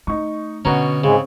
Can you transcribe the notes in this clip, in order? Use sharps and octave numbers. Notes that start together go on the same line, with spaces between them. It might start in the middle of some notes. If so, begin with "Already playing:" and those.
A3 D#4 C#6
B2 D3 C#4 F#5 A#5
G#2 C#3 G#3 C4